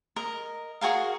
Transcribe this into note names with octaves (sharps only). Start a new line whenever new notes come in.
A#4 D#5
F#4 G#4 A#4 F5